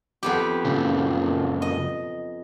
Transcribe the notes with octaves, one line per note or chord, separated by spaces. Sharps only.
F2 B3 G4
F#2 A#2 C#3
D#5